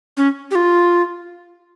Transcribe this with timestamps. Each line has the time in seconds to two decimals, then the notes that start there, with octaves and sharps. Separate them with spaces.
0.17 C#4
0.51 G4
0.55 F4